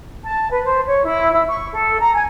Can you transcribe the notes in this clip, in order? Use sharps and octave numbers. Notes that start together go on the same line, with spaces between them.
A5
B4
C5
C#5
E4
E4
C#6
A4
A#5
G#5